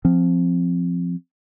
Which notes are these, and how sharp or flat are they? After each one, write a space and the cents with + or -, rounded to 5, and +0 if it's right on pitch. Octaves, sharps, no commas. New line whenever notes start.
F3 +0 C4 +0